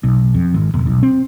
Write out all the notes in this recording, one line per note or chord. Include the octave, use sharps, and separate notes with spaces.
B1
F2
G#1
E1
B1
C4